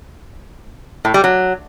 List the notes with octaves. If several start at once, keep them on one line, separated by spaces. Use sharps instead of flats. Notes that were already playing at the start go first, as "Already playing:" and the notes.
A2
G3
F#3